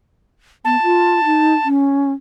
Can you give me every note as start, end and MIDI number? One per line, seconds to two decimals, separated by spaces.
0.65 0.76 59
0.65 1.68 81
0.83 1.23 65
1.25 1.53 63
1.64 2.12 61